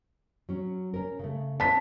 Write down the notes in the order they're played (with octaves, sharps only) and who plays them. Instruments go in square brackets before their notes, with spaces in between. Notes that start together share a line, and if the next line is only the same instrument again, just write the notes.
[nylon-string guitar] F#3 C#4
C#4 A#4
C#3 A3
[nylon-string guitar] C4 C#4 [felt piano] A5 B6